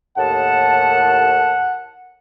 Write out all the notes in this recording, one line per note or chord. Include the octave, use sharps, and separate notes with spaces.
D#2 A2 F#5 A5